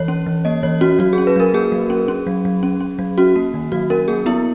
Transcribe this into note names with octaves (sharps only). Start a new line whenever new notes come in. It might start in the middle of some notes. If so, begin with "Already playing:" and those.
Already playing: E3 C#5
C#4
E3
A#3 D#5
E3 C#5
C#4 F#4
F#3 F#4
G#4
C#4
B4
F#3 A#4
A#3 G#4
F#3
C#4
C#4
F#3
F#3
C#4
C#4
F#3
C#4 F#4
A#3
D#3
F#3 F#4
C#4 A#4
A#3 G#4
B3 E4